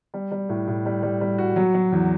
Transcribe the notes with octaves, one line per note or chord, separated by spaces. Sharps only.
G3
G3
A2
A2
G3
G3
G3
F#4
F#3
F#3
E2